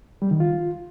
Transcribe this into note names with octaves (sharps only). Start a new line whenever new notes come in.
G3
D#3
F4